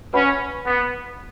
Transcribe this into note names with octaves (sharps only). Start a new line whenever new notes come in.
C#4 B4 F#5 B5
B3